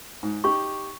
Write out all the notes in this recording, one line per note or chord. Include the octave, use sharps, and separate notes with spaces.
G#2
D#4 G4 C#6